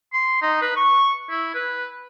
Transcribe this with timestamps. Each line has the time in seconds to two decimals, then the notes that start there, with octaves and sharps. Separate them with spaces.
0.13 C6
0.42 D#4
0.62 B4
0.76 C#6
1.30 E4
1.55 B4